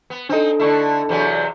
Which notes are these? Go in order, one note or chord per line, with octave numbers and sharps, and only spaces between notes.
B3
C4 D4 D#4 A4
D3 A3 E4
E2 C3 F#3